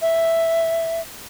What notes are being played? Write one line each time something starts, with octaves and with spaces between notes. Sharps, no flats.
E5